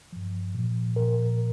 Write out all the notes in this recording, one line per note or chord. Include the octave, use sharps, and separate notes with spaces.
G2 F3
A#2 F3
A#2 F3 A#4